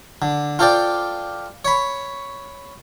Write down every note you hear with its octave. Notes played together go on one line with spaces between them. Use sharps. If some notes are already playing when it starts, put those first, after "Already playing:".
D3
F4 A4 C5 D5 G5
C#5 B5